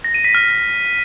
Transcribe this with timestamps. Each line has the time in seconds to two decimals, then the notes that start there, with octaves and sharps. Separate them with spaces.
0.04 A#6
0.14 D#7
0.24 B6
0.35 F6